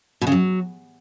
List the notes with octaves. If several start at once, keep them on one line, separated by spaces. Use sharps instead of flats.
B2
C#3
F#3